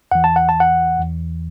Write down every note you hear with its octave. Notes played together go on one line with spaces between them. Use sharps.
E2 E3 F#5
A5
F#5
A5
F#5
E2 E3